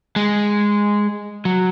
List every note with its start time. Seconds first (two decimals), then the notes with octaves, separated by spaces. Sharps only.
0.16 G#3
1.45 F#3